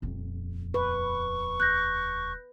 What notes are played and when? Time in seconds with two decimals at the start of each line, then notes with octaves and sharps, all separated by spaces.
0.02 D#1 F2
0.74 B4 C#6
1.60 F#6 G6 A#6